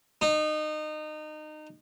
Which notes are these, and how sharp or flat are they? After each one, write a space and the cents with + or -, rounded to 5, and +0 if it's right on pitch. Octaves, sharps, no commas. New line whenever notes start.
D#4 -25